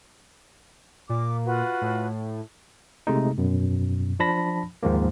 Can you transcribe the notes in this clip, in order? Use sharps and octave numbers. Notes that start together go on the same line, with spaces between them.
A#2 D6
F4 F#4 B4
A2
C3 G#3 A3 D#4
F#2 B2
F3 D4 A5 B5 A#6
D#2 G#2 D#3 F3 A#3